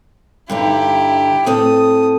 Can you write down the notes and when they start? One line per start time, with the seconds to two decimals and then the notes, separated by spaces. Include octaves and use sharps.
0.50 G2 D3 D#4 E4 G4
1.46 A2 C4 A4 D#6